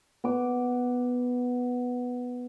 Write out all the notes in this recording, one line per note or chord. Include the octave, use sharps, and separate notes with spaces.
B3 D6